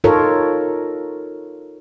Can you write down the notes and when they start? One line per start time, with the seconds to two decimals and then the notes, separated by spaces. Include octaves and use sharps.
0.04 D#4 F4 A4 A#4 C#5